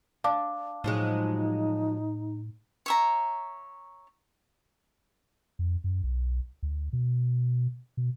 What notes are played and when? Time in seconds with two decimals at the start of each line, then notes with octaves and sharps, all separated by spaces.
0.24 D4 F5 A5 D6
0.84 A2 F3 F#3 G#3 D#4
2.86 C#5 E5 A#5
5.59 F2
5.84 F#2
6.03 B1
6.63 D2
6.93 B2
7.97 B2